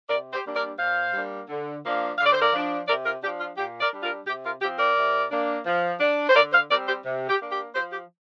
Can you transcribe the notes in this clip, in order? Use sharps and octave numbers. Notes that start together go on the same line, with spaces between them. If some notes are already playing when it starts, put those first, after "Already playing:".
C3 A#4 D5
G4 C5
G3 A#3 D4
A#4 D5
A#2 C5 F5
G3 A#3 D4
D3
F3 A#3 D4
D3 F5
D5
C5
A#4 D5
F3 D4
C3 A#4 D5
F4 A#4
F3 D4 G4
F4
A#2 G4
A#4 D5
G3 D4
F4 A#4
C3 G4
F4 A#4
F3 C4 G4
A#4 D5
C3
A#3 D4
F3
D4
C5
D3 A#4 D5
C5 F5
G3 C4 A#4 D5
G4 C5
C3
G4
A#3 D4
G4
F3 G4 C5
G4